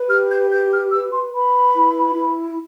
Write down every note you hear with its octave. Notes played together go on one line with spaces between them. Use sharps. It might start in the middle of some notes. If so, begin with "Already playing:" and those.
Already playing: B4
G4 F6
G6
B4 G6
F6
B4 E6
C6
B4 B5
E4
E4